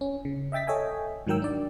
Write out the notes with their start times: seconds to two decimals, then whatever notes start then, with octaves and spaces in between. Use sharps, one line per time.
0.01 C#4
0.25 C#3
0.52 D#5 E5 G5 A6 B6
0.67 A4 C#5 D#5 E5 G5 G#5
1.27 G#2 D#3 F#3 A#4 G5 E6
1.42 D4 D5